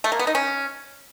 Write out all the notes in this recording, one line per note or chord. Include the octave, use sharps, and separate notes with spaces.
A3
A#3
B3
D#4
C#4